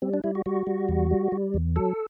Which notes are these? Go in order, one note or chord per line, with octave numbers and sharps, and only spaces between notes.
G3 C4
D4
G3 E4
F#4
G3 F#4
G3
E2
G3
G3
E2
F#3 A4